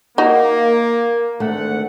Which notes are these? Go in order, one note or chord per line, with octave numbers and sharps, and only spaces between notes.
A#3 D#4 F#4
G#1 D2 A3 F#5